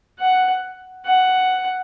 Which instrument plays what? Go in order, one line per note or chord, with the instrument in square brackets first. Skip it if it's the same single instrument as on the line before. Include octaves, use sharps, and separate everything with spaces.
[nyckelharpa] F#5
F#5